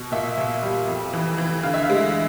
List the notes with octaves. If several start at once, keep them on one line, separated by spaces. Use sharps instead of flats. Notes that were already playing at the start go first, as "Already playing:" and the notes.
Already playing: B2
A#2 E5
A#2
G3
F2
E3
E3
D3 F5
E5
F5
G#3